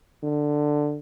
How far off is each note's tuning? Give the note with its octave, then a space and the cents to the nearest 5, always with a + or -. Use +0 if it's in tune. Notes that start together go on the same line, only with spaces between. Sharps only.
D3 +10